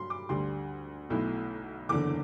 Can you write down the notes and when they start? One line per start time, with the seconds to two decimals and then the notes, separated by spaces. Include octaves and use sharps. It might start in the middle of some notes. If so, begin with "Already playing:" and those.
Already playing: G2 F#3 B5 C6
0.10 D6
0.29 D2 D3 G3 C6
1.10 B1 B2 A3 E4
1.89 F#1 E2 D3 D6